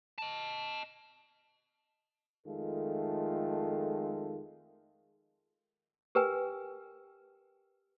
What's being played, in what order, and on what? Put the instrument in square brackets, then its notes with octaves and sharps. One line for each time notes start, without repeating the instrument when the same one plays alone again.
[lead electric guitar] D#5 A5
[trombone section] F2 D#3 G#3 A3 F4 A4
[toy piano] G4 A#4 B4 G5 G#5